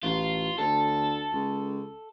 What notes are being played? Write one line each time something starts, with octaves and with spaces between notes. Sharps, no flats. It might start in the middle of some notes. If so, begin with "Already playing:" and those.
A1 F4
D2 A4
C#2